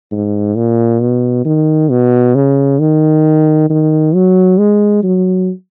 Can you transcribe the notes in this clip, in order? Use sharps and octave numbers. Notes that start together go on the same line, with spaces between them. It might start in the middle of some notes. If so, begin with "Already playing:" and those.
G#2
A#2
B2
D#3
B2
C#3
D#3
D#3
F#3
G#3
F#3